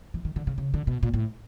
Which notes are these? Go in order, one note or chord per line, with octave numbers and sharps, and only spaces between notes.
E3
D#3
D3
C#3
C#3
D3
B2
A#2
A2